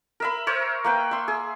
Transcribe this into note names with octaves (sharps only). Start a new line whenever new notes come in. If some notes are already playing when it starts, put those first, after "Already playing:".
A#4 E5 B5
A#4 C5 C#5 E5
A#3 B4 G5
E5 C6
G#4